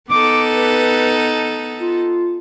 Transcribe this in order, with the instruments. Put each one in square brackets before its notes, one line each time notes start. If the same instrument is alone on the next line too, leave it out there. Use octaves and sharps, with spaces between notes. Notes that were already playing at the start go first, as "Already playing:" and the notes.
[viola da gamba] B3 D#4 A4 [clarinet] D6
[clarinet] B4
F4